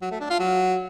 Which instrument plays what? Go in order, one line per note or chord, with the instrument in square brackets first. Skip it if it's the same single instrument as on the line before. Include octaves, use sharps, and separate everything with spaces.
[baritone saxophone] F#3
A3
D4
F4
F#3